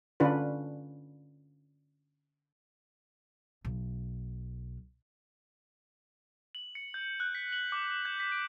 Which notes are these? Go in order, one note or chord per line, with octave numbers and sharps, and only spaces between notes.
D3 C#4 D4 F4 B4
B1
F#7
C#7
G6
F#6
B6
F#7
D6
G6
B6
D7